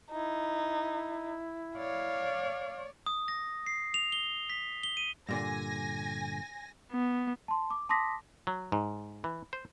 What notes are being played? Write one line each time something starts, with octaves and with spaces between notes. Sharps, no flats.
D#4 E4
C#5 D5 F5
D#6
A#6
C7
F7
G7
B6
G7
D#7
G2 A#2 D3 G#5 A#6
B3
A5 C6
D6
A5 C6 D6 D#6 A#6 B6
F#3
G#2
E3
C5